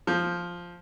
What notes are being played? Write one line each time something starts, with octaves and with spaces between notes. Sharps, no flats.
F3